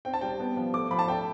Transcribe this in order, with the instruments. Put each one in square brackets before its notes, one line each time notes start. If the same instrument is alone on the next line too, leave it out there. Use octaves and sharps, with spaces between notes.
[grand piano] C4 G5
A5
G3 G5
B3
F3
A3 D6
F3 B5
A5
A3 G5